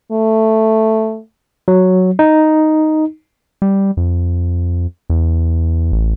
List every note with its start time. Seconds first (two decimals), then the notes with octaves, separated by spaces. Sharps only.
0.12 A3
1.68 F#3
2.19 D#4
3.62 G3
3.97 F2
5.10 E2
5.92 A1